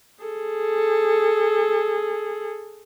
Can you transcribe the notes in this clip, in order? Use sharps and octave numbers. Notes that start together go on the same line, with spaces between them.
G#4 A4